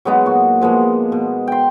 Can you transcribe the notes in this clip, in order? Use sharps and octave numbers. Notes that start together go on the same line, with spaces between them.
F#3 G#3 B3 D#4
A#2 F#4
F3 G#3 A#3 B3
B2
G5 C6